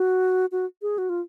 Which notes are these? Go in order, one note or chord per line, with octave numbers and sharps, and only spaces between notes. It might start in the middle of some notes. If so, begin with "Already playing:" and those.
Already playing: F#4
F#4
G#4
F#4
F4